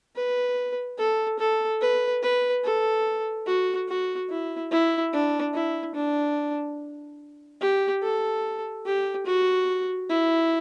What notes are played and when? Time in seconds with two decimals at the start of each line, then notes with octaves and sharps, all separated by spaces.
0.16 B4
0.98 A4
1.39 A4
1.81 B4
2.23 B4
2.64 A4
3.47 F#4
3.89 F#4
4.30 E4
4.71 E4
5.13 D4
5.54 E4
5.95 D4
7.61 G4
8.03 A4
8.86 G4
9.27 F#4
10.09 E4